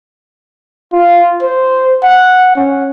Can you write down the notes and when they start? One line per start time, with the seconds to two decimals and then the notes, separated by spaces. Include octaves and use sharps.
0.93 F4
1.43 C5
2.03 F#5
2.56 C#4